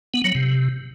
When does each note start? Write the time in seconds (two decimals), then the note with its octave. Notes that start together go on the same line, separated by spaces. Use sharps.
0.14 B3
0.24 F#3
0.35 C3